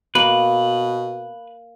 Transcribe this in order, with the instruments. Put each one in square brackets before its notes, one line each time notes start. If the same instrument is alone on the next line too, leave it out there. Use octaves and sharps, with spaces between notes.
[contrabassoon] B2 [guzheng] A#3 [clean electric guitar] B4